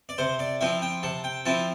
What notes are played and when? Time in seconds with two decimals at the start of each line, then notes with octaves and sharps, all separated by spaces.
0.09 D5
0.18 C3 C5
0.39 D5
0.61 F3 C4 E4 E5
0.82 G5
1.03 C3 A5
1.24 G5
1.45 F3 C4 E4 A5